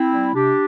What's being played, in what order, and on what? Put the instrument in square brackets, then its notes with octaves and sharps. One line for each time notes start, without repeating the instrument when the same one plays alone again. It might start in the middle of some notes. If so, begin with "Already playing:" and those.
Already playing: [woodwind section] C4 E4
G3
C3 D4 G4